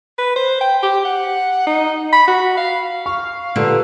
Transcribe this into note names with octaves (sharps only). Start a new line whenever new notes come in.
B4
C5
G5
G4
F#5
D#4
B5
F#4
F5
F5 C#6
A#2 D3 G4 B4 E6